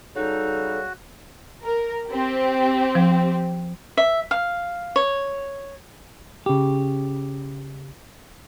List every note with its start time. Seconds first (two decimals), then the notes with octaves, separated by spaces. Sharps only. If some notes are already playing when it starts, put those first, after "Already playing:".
0.16 C#3 G3 D#4 F#4 A4
1.64 A#4
2.09 C4 G4
2.95 F3
3.97 E5
4.31 F5
4.96 C#5
6.46 C#3 G4